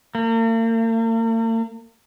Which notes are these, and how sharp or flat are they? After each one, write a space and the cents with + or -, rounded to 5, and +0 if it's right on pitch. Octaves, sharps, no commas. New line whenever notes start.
A#3 -45